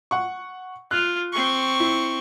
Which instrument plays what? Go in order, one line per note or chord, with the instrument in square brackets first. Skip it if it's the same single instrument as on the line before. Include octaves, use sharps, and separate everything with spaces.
[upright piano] F#5 C#6
[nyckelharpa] F4 [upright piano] F#6
[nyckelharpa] C4 C#6
[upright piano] E4